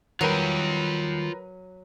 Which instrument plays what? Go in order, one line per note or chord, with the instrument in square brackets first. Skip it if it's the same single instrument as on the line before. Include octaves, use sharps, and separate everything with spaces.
[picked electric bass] D#3 G3 [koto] F#3 [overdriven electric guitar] F4 G5 [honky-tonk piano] A#4 B4 D#7